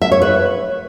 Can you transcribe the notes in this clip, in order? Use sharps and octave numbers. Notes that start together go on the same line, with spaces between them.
E5
C#5
B4